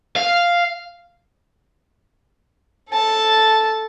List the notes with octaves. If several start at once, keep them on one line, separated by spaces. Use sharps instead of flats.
F5
A4 A5